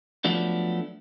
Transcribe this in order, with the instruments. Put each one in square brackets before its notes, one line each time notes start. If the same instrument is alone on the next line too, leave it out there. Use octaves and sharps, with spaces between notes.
[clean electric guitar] F3 F#3 A3 B3 D4